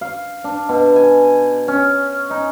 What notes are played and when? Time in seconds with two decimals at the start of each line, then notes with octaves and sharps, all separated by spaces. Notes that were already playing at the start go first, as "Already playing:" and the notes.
0.01 F5
0.44 D4
0.69 B2
0.96 G#5
1.68 C#4
2.30 D#4